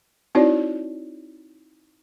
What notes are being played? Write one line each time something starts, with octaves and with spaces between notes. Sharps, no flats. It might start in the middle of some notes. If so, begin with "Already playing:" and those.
C4 D#4 E4 F#4 C#5 D5